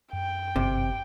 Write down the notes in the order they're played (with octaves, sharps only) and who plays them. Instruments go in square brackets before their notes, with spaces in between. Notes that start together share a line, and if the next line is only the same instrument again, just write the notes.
[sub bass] F#2 [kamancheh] G5
[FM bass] G1 [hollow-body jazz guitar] C3